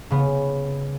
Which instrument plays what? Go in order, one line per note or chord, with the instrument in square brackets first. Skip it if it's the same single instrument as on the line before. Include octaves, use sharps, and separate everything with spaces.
[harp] C#3 B3